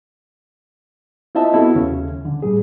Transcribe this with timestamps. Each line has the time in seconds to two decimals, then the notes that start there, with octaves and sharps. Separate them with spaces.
1.35 C4 E4 F4 D#5 E5 A5
1.53 B3 E4 F#4 A4
1.75 D#2 C#3 C#4
2.25 D3
2.42 A2 G3 G#4